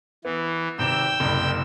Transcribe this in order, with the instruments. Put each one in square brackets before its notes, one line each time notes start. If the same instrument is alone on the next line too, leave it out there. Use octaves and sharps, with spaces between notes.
[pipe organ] E3 [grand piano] B3
[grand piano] G#1 C3 E7 [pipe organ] G5 E6
[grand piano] F#1 C2